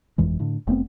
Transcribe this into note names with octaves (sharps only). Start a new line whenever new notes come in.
G1 F2 E3 G#3
A2 D3
F1 A3 B3 C4